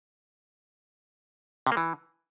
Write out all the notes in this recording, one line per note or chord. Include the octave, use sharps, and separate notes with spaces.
C3
A#3
E3